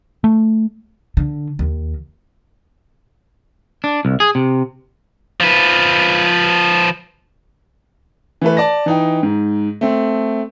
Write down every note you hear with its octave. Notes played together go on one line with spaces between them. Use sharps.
A3
D3
D#2
D4
C2
G#4
C3
F3 B4
E3 A3 B4
D5 A5 A#6
E3 D#4 G5
G#2
A3 C4